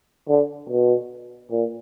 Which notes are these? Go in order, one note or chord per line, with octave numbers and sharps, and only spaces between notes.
D3
B2
A#2